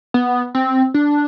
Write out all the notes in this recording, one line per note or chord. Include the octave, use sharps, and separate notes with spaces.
B3
C4
D4